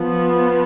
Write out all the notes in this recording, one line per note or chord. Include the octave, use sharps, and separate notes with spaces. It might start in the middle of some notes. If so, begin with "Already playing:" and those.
Already playing: F3 B3